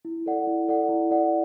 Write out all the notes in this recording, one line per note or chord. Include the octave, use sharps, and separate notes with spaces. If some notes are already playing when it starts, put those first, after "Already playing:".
E4
A4 D5 F#5
E4
A4 D5 F#5
E4
A4 D5 F#5